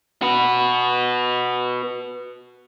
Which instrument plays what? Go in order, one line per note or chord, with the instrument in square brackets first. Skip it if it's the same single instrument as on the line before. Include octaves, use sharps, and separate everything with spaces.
[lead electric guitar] F#4 B4